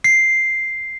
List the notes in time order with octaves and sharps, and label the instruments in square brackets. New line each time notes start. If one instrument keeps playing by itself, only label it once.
[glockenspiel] C7